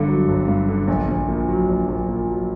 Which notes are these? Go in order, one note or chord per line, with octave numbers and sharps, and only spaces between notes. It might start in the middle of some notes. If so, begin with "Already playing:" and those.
Already playing: G1 G2 D3
F#3
G1
G2
D3
A#1
A#1
A#2
F#3
A#1
A#1
A#2
F#3